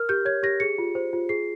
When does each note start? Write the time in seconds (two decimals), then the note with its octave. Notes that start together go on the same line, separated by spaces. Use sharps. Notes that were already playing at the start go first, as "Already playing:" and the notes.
Already playing: A#4 F6
0.09 G4 G6
0.25 C#5 G#6
0.43 G4 A#6
0.60 G#4 C#7
0.78 F4
0.95 C5
1.13 F4
1.29 G#4 C7